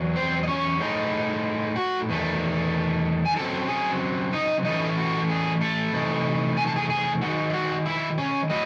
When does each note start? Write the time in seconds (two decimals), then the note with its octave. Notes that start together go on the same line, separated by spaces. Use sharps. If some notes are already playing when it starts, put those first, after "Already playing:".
Already playing: E2 F#3
0.16 C4 C5
0.43 D#5
0.47 C#4 C#5
0.80 A2 G#3 D#4
1.76 F#4 F#5
2.09 E2 D#3 A3
3.25 G#5
3.36 C#3 F#3 C4 A4 A5
3.68 G#4 G#5
4.33 D#4 D#5
4.65 A2 E3 A3 C#4 D#4 D#5
4.98 F#4
5.30 G#4
5.61 A3 A4
5.93 C3 E3 A3 D#4
6.57 G#5
6.67 A5
6.76 G#4 G#5
6.89 G#4 G#5
7.21 D#3 G#3 D#4 F#4 F#5
7.50 E5
7.53 F#4 F#5
7.86 E4 E5
8.18 C#4 C#5
8.50 A2 F#3 E4 D#5